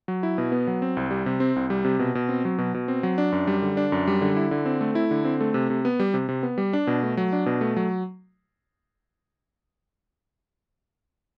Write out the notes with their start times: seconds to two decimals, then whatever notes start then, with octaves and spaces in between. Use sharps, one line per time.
0.08 F#3
0.23 E4
0.38 B2
0.52 B3
0.67 F#3
0.82 C4
0.97 C2
1.11 G3
1.26 C3
1.40 C4
1.56 C2
1.70 G3
1.85 C3
1.99 B2
2.15 B2
2.29 C4
2.45 F#3
2.58 B2
2.74 B2
2.88 C4
3.03 F#3
3.18 D4
3.32 F#2
3.47 G3
3.62 D3
3.77 D4
3.92 F#2
4.07 G3
4.21 D3
4.37 E4
4.51 D3
4.65 C4
4.81 A3
4.95 E4
5.11 D3
5.25 C4
5.41 A3
5.54 C3
5.70 C3
5.85 B3
6.00 G3
6.14 C3
6.29 C3
6.43 B3
6.58 G3
6.73 D4
6.87 B2
7.03 A3
7.17 F#3
7.33 D4
7.46 B2
7.61 A3
7.77 F#3